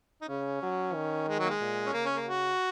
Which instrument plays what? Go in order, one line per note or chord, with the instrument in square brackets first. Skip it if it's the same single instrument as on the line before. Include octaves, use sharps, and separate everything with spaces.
[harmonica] D#4
[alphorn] C#3 [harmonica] C#4
[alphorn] F#3
D#3
[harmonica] G#3
F#3
A#3
G#3
[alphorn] A#2
[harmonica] C#4
[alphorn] C#3 [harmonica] A#3
[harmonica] C#4
A#3
F#4